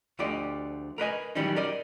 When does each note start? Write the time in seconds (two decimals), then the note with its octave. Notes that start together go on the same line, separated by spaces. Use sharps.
0.19 D2 D3 F3 G4 D5 D#5
0.98 A#4 B4 D#5 G#5
1.35 D#3 E3 F#3 G3 C#4 D#4
1.56 A#4 D5 D#5